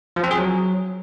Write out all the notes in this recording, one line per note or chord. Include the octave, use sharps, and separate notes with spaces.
F3
C4
G#4
F#3